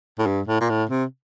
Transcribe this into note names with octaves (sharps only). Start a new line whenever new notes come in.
A2
G2
A2
A#2
A2
C3